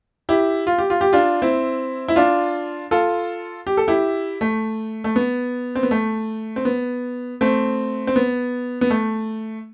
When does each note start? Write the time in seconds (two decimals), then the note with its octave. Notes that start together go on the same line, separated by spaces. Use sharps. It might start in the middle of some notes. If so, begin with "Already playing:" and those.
0.29 E4 G4
0.67 F4
0.78 G4
0.90 F4
1.01 G4
1.13 D4 F4
1.42 C4 E4
2.08 E4
2.16 D4 F4
2.91 F4 A4
3.67 G4
3.77 A4
3.88 E4 G4
4.41 A3
5.04 A3
5.16 B3
5.75 C4
5.83 B3
5.91 A3
6.56 C4
6.65 B3
7.41 A3 C4
8.07 C4
8.16 B3
8.81 B3
8.90 A3